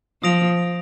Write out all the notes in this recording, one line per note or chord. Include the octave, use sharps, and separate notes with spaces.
F3 D#6 A#6 D7 F7